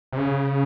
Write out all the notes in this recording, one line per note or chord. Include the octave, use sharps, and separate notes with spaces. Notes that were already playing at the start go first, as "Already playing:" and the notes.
C3
C#3